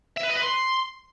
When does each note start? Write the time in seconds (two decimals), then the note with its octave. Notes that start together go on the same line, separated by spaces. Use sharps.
0.17 E5
0.23 B4
0.29 D#5
0.36 B4
0.42 C6